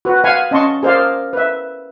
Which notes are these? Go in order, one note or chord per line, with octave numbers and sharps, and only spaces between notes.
F#4 B4
F5 F#5 G#5 B5
C#4 D#5 A5 C6 C#6
G#4 A#4 C5 D5 F5
B4 E5